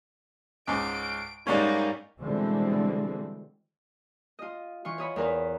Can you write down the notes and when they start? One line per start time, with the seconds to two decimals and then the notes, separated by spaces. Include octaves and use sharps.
0.67 C#2 G#2 D6 D7
1.47 G#2 G3 A#3 C#4 D#4
2.20 B2 D3 E3 G3 G#3 C4
4.39 F4 D#5
4.85 E3 F4 C#6
4.98 C#5 D#5 B5
5.16 E2 A#4 B4